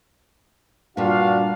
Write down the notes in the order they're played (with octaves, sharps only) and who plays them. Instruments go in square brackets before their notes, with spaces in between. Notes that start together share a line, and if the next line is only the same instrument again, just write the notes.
[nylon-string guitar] G2 A#2 [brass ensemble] D4 F#4 F5